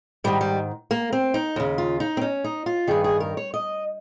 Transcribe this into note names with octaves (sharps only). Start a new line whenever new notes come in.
G#2 D#3 G3
G3
A#3
C4
D#4
D#2 C#3
F4
D#4
C4
C#4
D#4
F4
G2 D#3 G#4
G#4
A#4
C#5
D#5